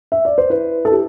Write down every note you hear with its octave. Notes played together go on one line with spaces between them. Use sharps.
E5
D5
C5
E4 B4
E4 A4
G4